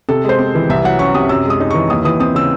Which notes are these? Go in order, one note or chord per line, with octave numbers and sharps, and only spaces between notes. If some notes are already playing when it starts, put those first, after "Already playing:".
C3 A4
G#3 C5
C4
E3
C2 E5
F#3 F#5
C#4 C#6
C3 D#6
F#2 E6
G#3 D#6
D#4
E3 C#6
D#2 D#6
E3 D#6
C4 D#6
C#3 E6